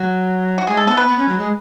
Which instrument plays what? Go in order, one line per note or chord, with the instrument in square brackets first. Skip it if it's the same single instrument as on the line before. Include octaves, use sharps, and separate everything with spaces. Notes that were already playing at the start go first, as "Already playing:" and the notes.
Already playing: [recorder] F#3 [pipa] F#4
[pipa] F#4
[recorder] G#3 [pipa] G#4
[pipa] A4
[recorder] B3 [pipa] A4
[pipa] B4
[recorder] B3
C#4
F#3
G#3